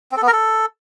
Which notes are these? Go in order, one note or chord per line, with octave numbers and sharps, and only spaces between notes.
C4
A4
B3
A#4
A4